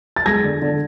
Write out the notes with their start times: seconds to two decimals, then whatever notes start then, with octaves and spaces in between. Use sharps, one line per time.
0.16 A6
0.26 G#3 G#6 A#6
0.44 D3
0.62 D3